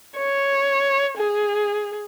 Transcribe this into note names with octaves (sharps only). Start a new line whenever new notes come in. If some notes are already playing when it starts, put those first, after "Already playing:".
C#5
G#4